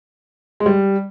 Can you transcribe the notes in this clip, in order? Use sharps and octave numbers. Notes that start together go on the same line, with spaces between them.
G#3
G3